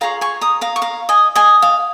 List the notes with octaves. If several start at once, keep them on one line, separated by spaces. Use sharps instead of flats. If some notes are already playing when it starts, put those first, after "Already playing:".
F4 G#4 C#5 F5 A#5
G#5 C#6
A#5 D#6
F5 A#5
C#6
F5 A#5
D#5 G#5
D#5 G#5
F5